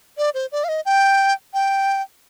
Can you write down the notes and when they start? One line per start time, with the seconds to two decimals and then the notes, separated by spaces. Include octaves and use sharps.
0.18 D5
0.34 C5
0.52 D5
0.64 F5
0.69 D#5
0.85 G5
1.54 G5